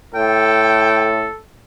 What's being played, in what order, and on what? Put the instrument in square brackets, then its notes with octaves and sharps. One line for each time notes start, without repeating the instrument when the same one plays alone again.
[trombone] A2 [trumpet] A4 [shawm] G5